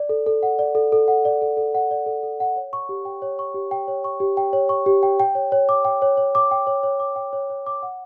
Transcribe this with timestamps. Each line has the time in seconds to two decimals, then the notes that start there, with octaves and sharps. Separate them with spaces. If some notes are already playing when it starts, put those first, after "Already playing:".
Already playing: D5
0.09 A4
0.27 A4
0.43 F#5
0.59 D5
0.75 A4
0.92 A4
1.08 F#5
1.25 D5
1.42 A4
1.57 A4
1.75 F#5
1.91 D5
2.06 A4
2.23 A4
2.40 F#5
2.56 C#5
2.73 C#6
2.89 G4
3.05 G5
3.22 C#5
3.39 C#6
3.54 G4
3.71 G5
3.88 C#5
4.04 C#6
4.20 G4
4.37 G5
4.53 C#5
4.69 C#6
4.86 G4
5.03 G5
5.20 G5
5.35 C#5
5.52 C#5
5.69 D6
5.85 G5
6.02 C#5
6.17 C#5
6.35 D6
6.51 G5
6.67 C#5
6.83 C#5
7.00 D6
7.16 G5
7.33 C#5
7.50 C#5
7.66 D6
7.83 F#5